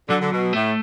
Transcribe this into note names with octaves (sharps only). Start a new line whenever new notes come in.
D3 F#3
D3
B2
A2 A3